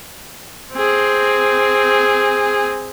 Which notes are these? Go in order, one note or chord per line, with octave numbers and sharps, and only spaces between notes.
C4 G#4